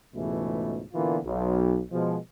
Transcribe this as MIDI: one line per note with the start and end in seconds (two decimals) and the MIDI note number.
0.14 0.82 37
0.14 0.82 44
0.14 0.82 47
0.14 0.82 52
0.14 0.82 57
0.93 1.17 46
0.93 1.17 50
0.93 1.17 52
0.93 1.17 58
0.93 1.17 59
0.93 1.17 65
1.25 1.81 35
1.92 2.16 47
1.92 2.16 53
1.92 2.16 56